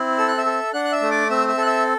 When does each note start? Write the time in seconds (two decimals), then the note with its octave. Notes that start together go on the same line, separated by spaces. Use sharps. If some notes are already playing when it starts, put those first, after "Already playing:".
Already playing: C4 E4
0.18 A4 E6
0.28 F#6
0.38 E5 E6
0.46 A4
0.73 D4 F#5 F#6
0.85 F#6
0.92 E5 E6
1.02 A3
1.11 D5 D6
1.30 C4 E5 E6
1.48 E5 E6
1.58 A4 F#6
1.67 E5 E6